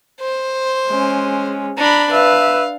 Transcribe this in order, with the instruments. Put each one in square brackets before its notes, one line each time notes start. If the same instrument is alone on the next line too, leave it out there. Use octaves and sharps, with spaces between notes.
[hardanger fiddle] C5
[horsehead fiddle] G#3 C#4
[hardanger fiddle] D4 B5 [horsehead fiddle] A#5
[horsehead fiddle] B4 E5 [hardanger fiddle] F5